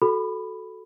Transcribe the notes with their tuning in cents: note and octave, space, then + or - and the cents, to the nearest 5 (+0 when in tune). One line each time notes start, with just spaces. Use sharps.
F#4 +0 A4 -5 B5 +5